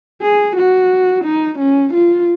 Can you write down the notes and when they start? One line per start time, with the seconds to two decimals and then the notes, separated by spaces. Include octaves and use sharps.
0.22 G#4
0.56 F#4
1.24 D#4
1.59 C#4
1.94 F4